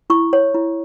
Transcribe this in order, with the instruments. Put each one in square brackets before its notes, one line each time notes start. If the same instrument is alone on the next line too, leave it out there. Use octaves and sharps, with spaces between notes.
[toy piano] E4 C#6
C#5
E4